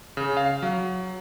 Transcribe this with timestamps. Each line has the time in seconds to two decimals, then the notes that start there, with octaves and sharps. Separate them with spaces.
0.17 C#3
0.37 F5
0.62 F#3